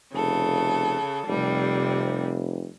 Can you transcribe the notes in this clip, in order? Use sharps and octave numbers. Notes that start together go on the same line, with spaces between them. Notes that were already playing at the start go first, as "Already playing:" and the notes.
F1 C#3 A4
F1 C3 G3